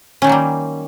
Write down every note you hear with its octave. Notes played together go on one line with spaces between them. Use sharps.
D#3 F#3 G3 A#3 C#4